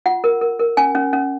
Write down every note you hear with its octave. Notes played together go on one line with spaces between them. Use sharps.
F4 F#5
A#4
A#4
A#4
C#4 G#5
C#4
C#4